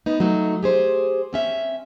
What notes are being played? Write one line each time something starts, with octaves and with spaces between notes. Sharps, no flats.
B3 D#4
F#3 A3 D#4
G4 G#4 C5
C4 C#4 E5